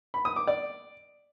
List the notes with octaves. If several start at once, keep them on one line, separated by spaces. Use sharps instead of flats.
B5
D#6
D6
D5